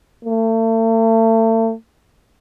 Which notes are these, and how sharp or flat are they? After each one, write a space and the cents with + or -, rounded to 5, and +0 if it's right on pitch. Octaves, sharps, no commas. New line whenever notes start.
A3 +40